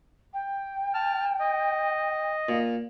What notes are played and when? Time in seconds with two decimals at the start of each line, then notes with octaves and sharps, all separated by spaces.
0.34 G5
0.94 A5 F6
1.40 D#5
2.49 A#2